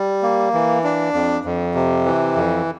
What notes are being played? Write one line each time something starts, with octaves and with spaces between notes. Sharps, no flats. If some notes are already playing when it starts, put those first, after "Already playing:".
Already playing: G3
A#3
E3
D4
F2
F2
C3
E3
F2